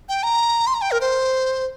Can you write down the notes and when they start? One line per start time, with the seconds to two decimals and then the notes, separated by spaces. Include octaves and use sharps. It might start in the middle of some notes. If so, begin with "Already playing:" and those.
0.09 G5
0.23 A#5
0.67 C6
0.74 A#5
0.82 G5
0.91 A#4
1.01 C5